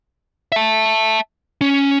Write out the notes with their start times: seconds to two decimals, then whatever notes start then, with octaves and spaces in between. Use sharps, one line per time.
0.52 E5 A5
1.61 C#4